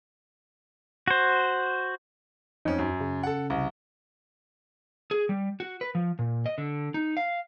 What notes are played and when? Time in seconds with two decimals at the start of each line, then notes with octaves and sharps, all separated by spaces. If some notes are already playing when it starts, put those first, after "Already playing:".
1.08 F#4 C5
2.65 F2 C#4 D#4
2.79 F#2
3.01 C#3
3.23 A4 F#5
3.50 C2
5.11 G#4
5.29 G3
5.60 F#4
5.81 B4
5.95 F3
6.19 A#2
6.46 D#5
6.58 D3
6.94 D#4
7.17 F5